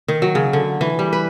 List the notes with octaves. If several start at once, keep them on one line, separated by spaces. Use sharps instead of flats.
D#3
F#3
C#3
D3
E3
G3
B4